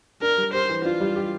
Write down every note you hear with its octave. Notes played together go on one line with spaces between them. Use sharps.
D4 A#4
G3
G4 C5
E3
D4 F4
G3
G4